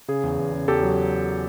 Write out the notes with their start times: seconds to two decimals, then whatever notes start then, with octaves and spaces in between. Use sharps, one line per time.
0.08 C#3 G#4
0.23 E2
0.39 E2
0.53 C#3
0.68 E2 G4 A4
0.83 F#3